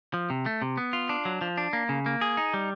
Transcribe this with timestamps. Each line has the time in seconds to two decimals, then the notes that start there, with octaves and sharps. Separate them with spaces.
0.14 F3
0.30 C3
0.46 A3
0.62 C3
0.77 B3
0.93 F4
1.09 D4
1.25 F#3
1.41 F3
1.57 D4
1.73 A#3
1.89 C#3
2.06 A#3
2.21 G#4
2.37 D#4
2.54 G3